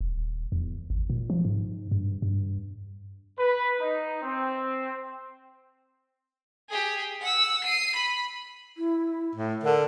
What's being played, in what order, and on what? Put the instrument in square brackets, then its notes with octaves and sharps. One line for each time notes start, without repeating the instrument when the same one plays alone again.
[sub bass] D#1
E2
G#1
A#2
F3
G#2
G2
G2
[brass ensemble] B4
D#4
C4
[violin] G4 G#4
F#5 E6
C7 D#7
B5
[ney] E4
[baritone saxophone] A2
[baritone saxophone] D3 [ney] A#4